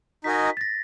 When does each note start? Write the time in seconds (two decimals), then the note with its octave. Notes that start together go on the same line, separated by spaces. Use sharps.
0.24 D#4 F#4 A#4 D#5 G#5 B6
0.57 A6
0.61 A#6